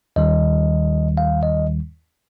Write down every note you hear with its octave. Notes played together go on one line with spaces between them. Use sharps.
D#2 D#3 G3 D#5
F5
D#5